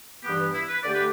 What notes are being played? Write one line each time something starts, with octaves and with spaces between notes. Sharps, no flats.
G2 E3 B3 G4
E4
B4
D3 A3 G4 D5
B4